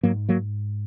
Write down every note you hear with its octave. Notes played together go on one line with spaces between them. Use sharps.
G#2 F#3 A#3
F#3 A#3